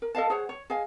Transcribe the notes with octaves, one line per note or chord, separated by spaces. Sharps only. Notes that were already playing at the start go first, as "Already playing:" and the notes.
A#4
A4 D#5 F5 A5
G#4 C5 C#5 F#5
C#5
G#4 D#5 F5 G#5